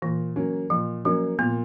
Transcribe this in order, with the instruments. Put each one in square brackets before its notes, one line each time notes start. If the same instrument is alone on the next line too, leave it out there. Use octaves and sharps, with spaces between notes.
[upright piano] A#2 [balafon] E3
[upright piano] F#3 A#3 C#4
[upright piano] A#2 [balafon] F3
[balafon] F3 [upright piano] F#3 A#3 C#4
[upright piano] A#2 [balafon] B3